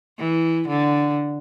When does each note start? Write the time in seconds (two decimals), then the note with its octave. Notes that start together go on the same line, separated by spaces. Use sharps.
0.18 E3
0.68 D3